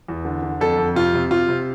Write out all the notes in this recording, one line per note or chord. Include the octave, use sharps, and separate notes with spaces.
E2
D3
D3
F2 A4
F2
C3 F4
C3
C3 F4
C3